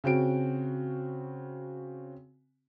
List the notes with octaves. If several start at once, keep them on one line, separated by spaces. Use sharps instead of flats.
C#3 C4 F#4 D7